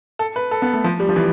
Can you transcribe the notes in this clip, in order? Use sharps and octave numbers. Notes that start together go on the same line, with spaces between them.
A4
B4
A4
B3
A3
F3
G3
F3
E3